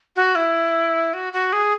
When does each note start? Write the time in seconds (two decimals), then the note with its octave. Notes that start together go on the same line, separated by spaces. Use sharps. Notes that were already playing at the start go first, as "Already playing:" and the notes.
0.16 F#4
0.35 E4
1.14 F#4
1.33 F#4
1.53 G#4